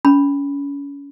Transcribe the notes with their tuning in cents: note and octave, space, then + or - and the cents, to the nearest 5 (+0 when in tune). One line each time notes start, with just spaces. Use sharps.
C#4 +30 B5 +0